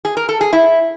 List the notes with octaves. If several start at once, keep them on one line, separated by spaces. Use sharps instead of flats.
G#4
A#4
A4
G#4
E4